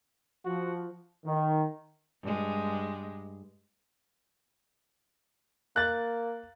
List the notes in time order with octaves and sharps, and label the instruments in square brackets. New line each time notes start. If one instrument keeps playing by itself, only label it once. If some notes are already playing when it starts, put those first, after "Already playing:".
[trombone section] F3 [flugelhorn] F#4
[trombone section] D#3
[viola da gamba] G2 G#3
[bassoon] A#3 [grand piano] F#6 A6